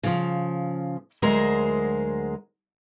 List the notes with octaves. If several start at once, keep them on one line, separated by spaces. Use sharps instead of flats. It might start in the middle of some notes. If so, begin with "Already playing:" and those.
C#3 F3
D2 F#3 G#3 G#4 A#4 C5